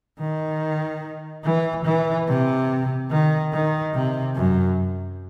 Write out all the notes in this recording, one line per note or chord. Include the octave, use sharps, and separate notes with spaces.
D#3
E3
E3
C3
D#3
D#3
C3
F#2